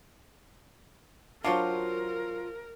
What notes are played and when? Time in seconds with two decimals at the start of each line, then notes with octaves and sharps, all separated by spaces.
1.44 F#3 D4 F4 F#4 A#4 C5 F5